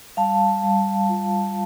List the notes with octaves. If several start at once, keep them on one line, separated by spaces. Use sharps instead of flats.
G3 F5 A5
G3
F4